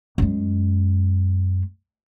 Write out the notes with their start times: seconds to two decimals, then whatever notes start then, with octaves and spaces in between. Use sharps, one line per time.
0.18 F#2 G#3